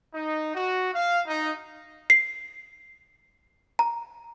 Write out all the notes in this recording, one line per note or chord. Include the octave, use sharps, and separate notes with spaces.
D#4
F#4
F5
D#4
C7
A#5